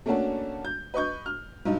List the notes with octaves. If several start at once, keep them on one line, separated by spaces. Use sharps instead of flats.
A3 A#3 C#4 D4 F#4 A4
G6
B4 D#5 C#6 G6
F6
B1 G2 D#4